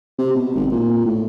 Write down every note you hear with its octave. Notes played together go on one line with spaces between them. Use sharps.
C3
B2
G#1
A#2
A2